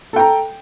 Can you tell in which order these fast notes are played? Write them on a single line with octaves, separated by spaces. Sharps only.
A4 G5 A#5